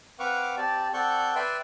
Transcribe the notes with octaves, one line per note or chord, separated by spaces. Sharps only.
C4 B4 F5 F#5 C#6 D6
C4 G4 D5 A5
C4 A4 D5 F#5 C#6 G6
B4 D5 E5 G5 C6